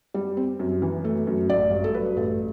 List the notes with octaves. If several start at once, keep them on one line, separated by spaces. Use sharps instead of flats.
G3
C4
F#2
E3
A3
F#2
A1 D5
G2
A4
F#3 B4
A1 A4